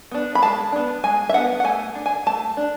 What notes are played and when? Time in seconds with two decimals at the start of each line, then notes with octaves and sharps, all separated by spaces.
0.11 B3 D4
0.35 B5
0.42 G#3 A5
0.72 B3 D4
1.04 G#3 G#5
1.29 E5
1.34 B3 D4 F#5
1.60 F#5
1.64 A3 G#5
1.95 D4
2.06 G#5
2.26 A3 A5
2.57 D4